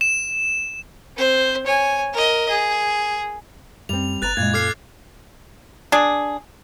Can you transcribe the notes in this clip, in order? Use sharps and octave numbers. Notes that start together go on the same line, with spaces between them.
E7
C4 C5
C#5 G#5
A#4 D#5
G#4
F#2 G3 C4 F7
G1 B4 A#5 F#6 A6 F7
F#2 A#2 G#3 E4 G#6
A4 D6 F6 C7
D4 G#4